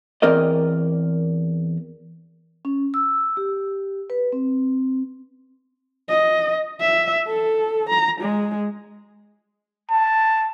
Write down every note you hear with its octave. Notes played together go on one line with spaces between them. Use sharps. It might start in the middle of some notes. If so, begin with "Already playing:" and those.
E2 C4 A#4 D5 D#5
C#4
E6
G4
B4
C4
D#5
E5
A4
A#5
G#3
A5